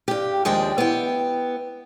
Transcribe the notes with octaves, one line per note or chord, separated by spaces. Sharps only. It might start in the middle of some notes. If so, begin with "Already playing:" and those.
G2 G4
D#2 F3 G#3 D4 G5
B3 E4 G5